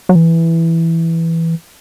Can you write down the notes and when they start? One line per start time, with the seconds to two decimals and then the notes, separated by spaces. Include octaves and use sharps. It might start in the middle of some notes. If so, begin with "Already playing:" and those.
0.09 F#3
0.15 E3